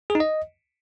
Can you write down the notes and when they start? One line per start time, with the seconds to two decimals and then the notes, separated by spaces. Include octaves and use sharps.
0.10 G#4
0.15 D#4
0.20 D#5